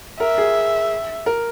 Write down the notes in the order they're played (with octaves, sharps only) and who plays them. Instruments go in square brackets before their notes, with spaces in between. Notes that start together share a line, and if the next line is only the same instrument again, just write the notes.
[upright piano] A#4 [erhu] E5
[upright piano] G#4
A#4